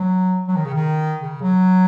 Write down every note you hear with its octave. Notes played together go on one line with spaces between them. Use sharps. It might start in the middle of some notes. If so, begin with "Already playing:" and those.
Already playing: F#3
F#3
D#3
C#3
D#3
C#3
F#3